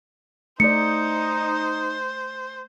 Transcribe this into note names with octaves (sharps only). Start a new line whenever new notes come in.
A3 D#4 C5 D5 C#7